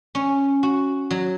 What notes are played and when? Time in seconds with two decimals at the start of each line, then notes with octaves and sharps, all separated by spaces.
0.15 C#4
0.63 F#4
1.11 F#3